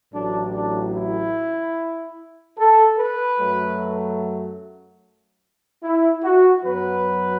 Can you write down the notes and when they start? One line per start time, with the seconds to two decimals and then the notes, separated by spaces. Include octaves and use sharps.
0.13 A1 A2 F#3 D4
0.54 D4
0.94 E4
2.57 A4
2.98 B4
3.38 F#2 F#3 A3
5.82 E4
6.23 F#4
6.64 F#2 F#3 B3 B4